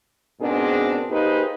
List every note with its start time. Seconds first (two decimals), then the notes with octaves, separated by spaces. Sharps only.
0.41 G#2 B2 C4 D4 G#4 A#4
1.10 A#3 D#4 G4 G#4 B4 C5